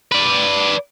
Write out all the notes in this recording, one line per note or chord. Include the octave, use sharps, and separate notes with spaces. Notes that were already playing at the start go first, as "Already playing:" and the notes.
B4 D5